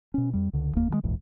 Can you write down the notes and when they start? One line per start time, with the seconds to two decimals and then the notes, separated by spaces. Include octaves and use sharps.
0.14 B2 C#4
0.34 F2 G3
0.53 C#2 D3
0.74 F1 D#2 A#3
0.90 D#3 E3 G#3
1.03 D#1 A#1 E2 G#2